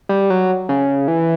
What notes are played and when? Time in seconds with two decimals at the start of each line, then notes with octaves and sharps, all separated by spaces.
0.09 G3
0.30 F#3
0.69 C#3
1.08 E3